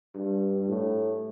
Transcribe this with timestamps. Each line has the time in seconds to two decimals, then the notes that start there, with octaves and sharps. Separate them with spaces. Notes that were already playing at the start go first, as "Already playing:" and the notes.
0.15 G2
0.69 A2